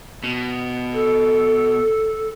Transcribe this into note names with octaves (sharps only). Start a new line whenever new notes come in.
B2
A4